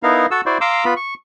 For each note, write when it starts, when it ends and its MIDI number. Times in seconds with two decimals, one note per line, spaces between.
0.03 0.26 59
0.03 0.26 63
0.03 0.26 64
0.03 0.26 70
0.03 0.26 77
0.31 0.41 66
0.31 0.41 69
0.31 0.41 78
0.31 0.41 88
0.46 0.58 64
0.46 0.58 66
0.46 0.58 72
0.46 0.58 74
0.61 0.85 77
0.61 0.85 82
0.61 0.85 84
0.61 0.85 86
0.61 0.85 88
0.85 0.94 59
0.85 0.94 65
0.85 0.94 83
0.96 1.14 85